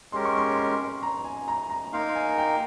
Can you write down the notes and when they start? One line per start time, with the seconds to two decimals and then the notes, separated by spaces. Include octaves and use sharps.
0.12 G#3 C#4 G4 A#4 C6
0.25 C#6
0.37 C6
0.57 C6
1.03 A#5
1.25 G#5
1.48 A#5
1.70 A#5
1.93 A#3 D#4 A#4 F5 C6
2.15 G#5
2.38 G5